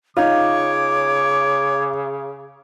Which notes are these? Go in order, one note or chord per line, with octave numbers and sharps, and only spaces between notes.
C#3 D#4 F4 C#5 D6